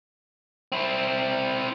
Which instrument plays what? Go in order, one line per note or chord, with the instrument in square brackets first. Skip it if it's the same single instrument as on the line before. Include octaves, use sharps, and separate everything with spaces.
[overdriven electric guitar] C4 E4